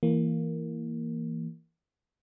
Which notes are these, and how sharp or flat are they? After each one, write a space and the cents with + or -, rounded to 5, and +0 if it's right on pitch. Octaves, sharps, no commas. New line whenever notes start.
E3 +0 A#3 -10